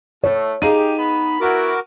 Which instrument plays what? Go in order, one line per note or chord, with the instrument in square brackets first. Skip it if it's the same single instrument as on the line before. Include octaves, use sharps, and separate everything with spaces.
[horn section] A2 A3 [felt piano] C#5
[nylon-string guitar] D#4 G#4 F5 [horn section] G4 [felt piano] D#7
[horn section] B3 B5
[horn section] B3 E4 [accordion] F#4 A#4 D6